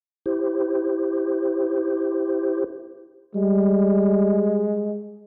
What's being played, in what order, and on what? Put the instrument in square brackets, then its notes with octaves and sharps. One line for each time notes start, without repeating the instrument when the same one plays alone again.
[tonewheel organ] E4 G4 C5
[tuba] G3 [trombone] G#3